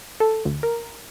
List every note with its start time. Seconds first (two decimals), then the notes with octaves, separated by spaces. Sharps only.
0.20 A4
0.45 D2
0.63 A#4